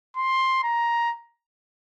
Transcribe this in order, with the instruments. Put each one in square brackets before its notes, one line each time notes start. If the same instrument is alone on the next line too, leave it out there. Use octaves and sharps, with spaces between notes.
[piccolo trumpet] C6
A#5